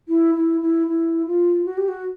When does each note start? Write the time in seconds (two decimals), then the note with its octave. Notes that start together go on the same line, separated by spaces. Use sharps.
0.08 E4
0.35 E4
0.61 E4
0.87 E4
1.26 F4
1.66 F#4
1.78 G4
1.88 F#4